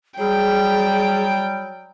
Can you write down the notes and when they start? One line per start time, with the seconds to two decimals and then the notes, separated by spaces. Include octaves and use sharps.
0.18 F#3 G3 G#4 G5